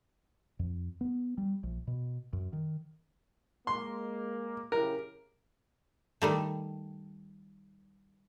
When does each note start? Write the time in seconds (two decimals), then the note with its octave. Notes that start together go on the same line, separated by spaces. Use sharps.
0.59 F2
1.01 B3
1.38 G3
1.63 A#1
1.87 B2
2.33 F#2
2.53 D#3
3.67 G#3 A#3 C6
4.72 C#3 E4 G4 A#4
6.22 D#3 G3 A3